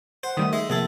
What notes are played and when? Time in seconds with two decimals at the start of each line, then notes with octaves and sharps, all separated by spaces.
0.23 C5 F#5
0.37 D#3 G3 A3 D#6
0.53 G#3 D#5 E5
0.70 A#1 C3 G#4 A4